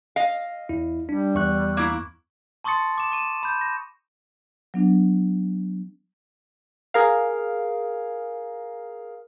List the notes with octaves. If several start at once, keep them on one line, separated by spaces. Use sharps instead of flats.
D#5 F5
E2 E4
G3 D4
E2 C#6 F#6
A#3 E4
A5 C6 C#6 D#6 A6 C#7
D6 D#6 E7
C#6 D#7 E7
B5 G6
A#6
F#3 B3 D4
G#4 A#4 F5